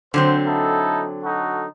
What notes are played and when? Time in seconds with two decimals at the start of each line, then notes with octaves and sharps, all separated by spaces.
0.14 D3 F#3 C4 C5
0.46 D#4 E4 A4
1.24 D#4 F#4 A4